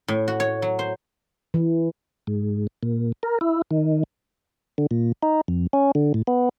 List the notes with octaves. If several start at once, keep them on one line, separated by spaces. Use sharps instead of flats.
A2
F#4
C#5
F#3
C5
E3
G#2
A#2
A#4
E4
D#3
D3
A#2
D#4
F2
C#4
D3
A2
B3